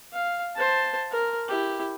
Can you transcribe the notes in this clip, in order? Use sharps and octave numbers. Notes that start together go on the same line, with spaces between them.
F5
C5 A5
A#4
E4 G4